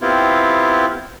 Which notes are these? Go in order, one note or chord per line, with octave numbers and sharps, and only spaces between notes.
B3 C4 E4 F4 G4